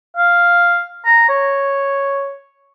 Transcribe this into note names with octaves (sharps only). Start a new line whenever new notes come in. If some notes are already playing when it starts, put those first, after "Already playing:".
F5
A#5
C#5